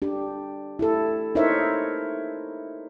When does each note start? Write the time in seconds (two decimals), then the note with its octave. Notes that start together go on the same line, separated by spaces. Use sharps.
0.02 D4 G4
0.79 E4 G4 A4
1.35 D#4 E4 A#4 C5 C#5 E5